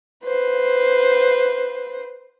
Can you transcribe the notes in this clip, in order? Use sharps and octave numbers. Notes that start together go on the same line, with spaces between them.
B4 C5